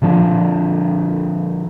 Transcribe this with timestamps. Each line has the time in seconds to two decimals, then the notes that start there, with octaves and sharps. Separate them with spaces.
0.02 A#2 D3 F3 D4